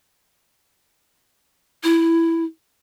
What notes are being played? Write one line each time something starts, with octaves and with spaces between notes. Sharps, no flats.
E4